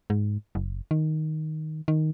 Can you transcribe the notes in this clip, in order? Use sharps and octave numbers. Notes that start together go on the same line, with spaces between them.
G#2
F#1
D#3
D#3